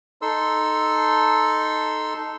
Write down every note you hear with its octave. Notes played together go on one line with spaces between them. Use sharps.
D#4 A4 C6 E6